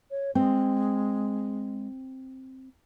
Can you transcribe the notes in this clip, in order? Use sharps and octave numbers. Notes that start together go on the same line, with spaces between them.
C#5
G#3 C4